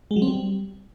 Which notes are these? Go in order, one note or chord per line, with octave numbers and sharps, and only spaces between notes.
G#3
F#3
C4
G3